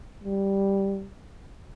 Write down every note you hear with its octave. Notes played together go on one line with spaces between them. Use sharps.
G3